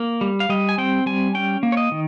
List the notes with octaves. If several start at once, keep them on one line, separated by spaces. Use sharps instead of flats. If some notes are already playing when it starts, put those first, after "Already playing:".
Already playing: A#3
G3
F5
G3 D#5
G#5
C4 G5
G3 G#5
C#4 G5
A#3
C#5
D#5
D#3